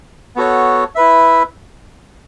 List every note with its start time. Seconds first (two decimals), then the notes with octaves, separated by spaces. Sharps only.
0.36 B3 F#4 A4 C#5
0.95 E4 B4 E5